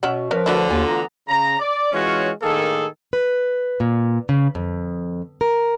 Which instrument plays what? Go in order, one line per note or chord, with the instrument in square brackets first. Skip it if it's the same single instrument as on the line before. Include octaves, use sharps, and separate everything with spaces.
[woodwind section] B2 [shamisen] C#4 E5 F#5
[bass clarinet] F3 [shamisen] C#4 F5 [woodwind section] A#4 B4
[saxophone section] D2 D3 [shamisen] F#3 D4 E4
[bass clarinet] D#2 [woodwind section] F4 [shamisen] G#5
[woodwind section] E3 B3 A#5 [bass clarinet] F4
[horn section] C#3 A#5
D5
E3 G#3 C#4 F4 F#4 C#5
A2 D#3 A#3 G#4 A4
[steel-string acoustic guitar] B4
A#2
C#3
F2
A#4